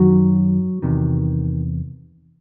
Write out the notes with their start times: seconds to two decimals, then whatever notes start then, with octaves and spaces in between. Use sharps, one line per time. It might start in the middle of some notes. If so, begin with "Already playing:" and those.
Already playing: F#2 D#3 F#3 F#4
0.82 E2 C3 D#3